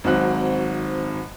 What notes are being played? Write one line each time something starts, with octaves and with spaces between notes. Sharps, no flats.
G#1 G#2 F#3 C4 F#6